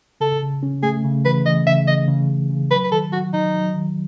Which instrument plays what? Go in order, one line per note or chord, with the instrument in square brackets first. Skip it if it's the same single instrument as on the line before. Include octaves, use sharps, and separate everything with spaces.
[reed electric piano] C#3 [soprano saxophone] A4
[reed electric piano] C#3
C#4
[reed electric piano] A3 [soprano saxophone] G#4
[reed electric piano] C#3
[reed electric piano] E3 [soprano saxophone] B4
[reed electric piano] E3 [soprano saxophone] D#5
[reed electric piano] C#3 [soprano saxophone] E5
[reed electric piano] C#3 [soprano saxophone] D#5
[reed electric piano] C#3
C#3
C#3
[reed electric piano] F#3 [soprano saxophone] B4
[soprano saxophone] B4
[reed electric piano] D#3 [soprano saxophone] A4
[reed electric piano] F#3 [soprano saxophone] F#4
[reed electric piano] F#3 [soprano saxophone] D#4
[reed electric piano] F#3
D#3